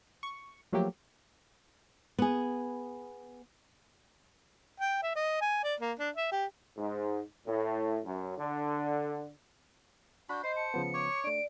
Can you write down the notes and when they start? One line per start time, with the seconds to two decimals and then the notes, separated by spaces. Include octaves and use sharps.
0.23 C#6
0.73 F3 F#3 A3 A#3 G4
2.19 B3 G#4
4.80 G5
5.03 E5
5.15 D#5
5.41 G#5
5.64 D5
5.80 A#3
5.99 D4
6.16 E5
6.32 G4
6.78 G#2
7.46 A2
8.05 F#2
8.38 D3
10.29 D4 F#4 B5 G6
10.44 C5 D#5 C7
10.56 A5 C#7
10.74 C#3 F3 B3
10.94 C#5 C#6 D6
11.24 A3 D4 D5 D7